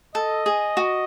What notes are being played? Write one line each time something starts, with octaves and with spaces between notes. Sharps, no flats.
A4 D#5
G#4
F#4